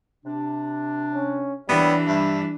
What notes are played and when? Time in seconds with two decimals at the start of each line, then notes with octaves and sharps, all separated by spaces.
0.25 C3 D4
1.15 C#4
1.69 E3 G3 A#3 B3 D4 C#5 E5
2.07 G2 G3 E4